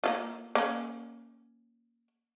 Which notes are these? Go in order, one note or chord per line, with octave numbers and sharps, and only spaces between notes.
A#3 E4 F4
A#3 C#4